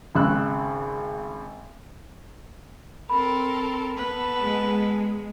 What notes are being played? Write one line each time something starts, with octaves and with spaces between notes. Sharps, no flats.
G#1 C#3 E6 F#6
C4 A4 A#4 B5
B3 A4 B4
G#3